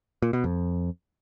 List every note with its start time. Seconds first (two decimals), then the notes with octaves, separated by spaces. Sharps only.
0.22 A#2
0.33 B2
0.44 F2